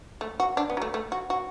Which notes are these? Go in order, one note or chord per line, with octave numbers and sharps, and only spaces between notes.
A3
F#4
D4
B3
F#3
A3
A3
F#4
F#4